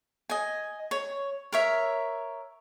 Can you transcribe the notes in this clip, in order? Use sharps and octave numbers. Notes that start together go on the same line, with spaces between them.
D#5 G#5
C#5
A#4 C#5 E5